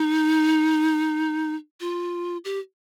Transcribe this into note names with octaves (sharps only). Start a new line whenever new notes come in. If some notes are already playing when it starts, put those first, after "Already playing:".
Already playing: D#4
F4
G4